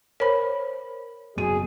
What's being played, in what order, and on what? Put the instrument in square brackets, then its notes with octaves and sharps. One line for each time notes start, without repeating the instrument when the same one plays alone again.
[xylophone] A#4 B5 [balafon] C5 C#5
[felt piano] F#1 B2 D#7 [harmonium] G#4